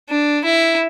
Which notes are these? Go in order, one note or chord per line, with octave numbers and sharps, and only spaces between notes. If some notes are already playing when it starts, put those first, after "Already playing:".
D4
E4